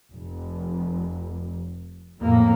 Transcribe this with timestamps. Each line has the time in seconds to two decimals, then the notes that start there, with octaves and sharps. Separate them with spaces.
0.12 F1
2.20 F2 A2 A#3